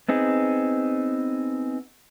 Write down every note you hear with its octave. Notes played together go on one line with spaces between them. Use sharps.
B3 C4 D#4 G#4